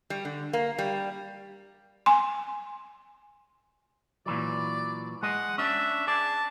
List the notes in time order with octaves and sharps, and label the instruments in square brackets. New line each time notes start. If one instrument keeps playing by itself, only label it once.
[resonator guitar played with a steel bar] G3
D3
A#3
G3
[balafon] G#5 C6
[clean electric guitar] A#2 E3 F#3 [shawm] D5
[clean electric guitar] G#3 D#5 [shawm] F#5
[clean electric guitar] C#4 D4 [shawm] E5
[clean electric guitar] G#4 D5 [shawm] A5